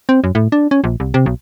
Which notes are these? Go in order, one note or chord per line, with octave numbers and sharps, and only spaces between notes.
C4
F#2
A2
D4
C#4
A#1
C2
C3
B1